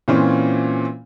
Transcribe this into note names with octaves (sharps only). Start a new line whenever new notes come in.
A#2 E3 C4 C#4 F4